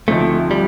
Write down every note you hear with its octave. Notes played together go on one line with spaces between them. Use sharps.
D2 C3 F3 A3 C4 D#4
G3